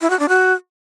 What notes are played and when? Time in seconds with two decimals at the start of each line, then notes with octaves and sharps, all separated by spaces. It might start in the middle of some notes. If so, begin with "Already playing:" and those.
0.01 E4
0.10 F#4
0.19 D4
0.29 F#4